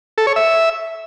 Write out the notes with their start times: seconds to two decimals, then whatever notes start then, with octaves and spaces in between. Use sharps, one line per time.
0.18 A4
0.27 C#5
0.36 E5